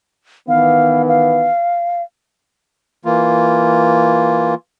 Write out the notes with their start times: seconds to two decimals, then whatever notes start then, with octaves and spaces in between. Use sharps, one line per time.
0.48 D#3 E3 B3 F5
1.08 F5
3.05 E3 A#3 F4